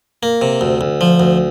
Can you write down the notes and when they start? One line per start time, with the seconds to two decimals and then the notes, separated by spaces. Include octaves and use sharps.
0.23 A#3
0.41 C3
0.61 D2
0.81 D2
1.01 F3
1.20 D2